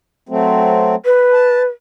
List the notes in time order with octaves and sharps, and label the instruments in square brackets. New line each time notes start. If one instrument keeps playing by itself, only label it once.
[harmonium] F#3 A3 C4
[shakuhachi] B4
[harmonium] A5